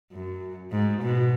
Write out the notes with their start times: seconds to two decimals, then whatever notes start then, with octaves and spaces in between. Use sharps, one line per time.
0.12 F#2
0.72 G#2
1.02 B2